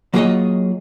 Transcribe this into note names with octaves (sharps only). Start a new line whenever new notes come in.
F#3 A#3 F4 G#4 C#5 D#5